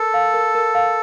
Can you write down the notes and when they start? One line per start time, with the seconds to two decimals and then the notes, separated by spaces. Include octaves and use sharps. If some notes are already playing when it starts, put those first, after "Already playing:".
Already playing: A4 A#4
0.14 F5
0.34 A#4
0.55 A#4
0.75 F5